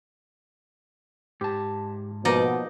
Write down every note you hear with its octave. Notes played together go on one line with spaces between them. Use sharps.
G#2 G4 A5
B2 F3 A#3 D#4 D5 D#5